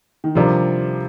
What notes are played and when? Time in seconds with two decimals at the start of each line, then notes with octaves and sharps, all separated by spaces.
0.24 D#3
0.35 C3 F3 G3 D4 F4 A#4